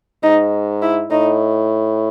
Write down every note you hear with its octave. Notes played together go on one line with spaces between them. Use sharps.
G#2 D#4
E4
A2 D#4